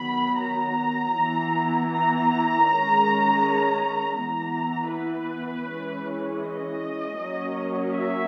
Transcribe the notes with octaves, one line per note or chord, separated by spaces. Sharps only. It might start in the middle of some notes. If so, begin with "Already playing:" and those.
Already playing: D#3 F#3 B3 B5
A#5
E3 B3
A#5
D#3 G#3 C#4
E3 B3 A#5
B4
E3 G#3 C#4
D#5
F#3 A#3 C#4
E5